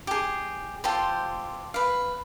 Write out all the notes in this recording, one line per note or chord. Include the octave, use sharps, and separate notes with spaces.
G4 G#4
F4 G4 A4 C5
B4 F5